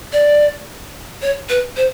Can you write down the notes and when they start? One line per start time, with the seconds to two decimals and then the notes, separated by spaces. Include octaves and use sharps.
0.13 D5
1.22 C#5
1.49 B4
1.77 C5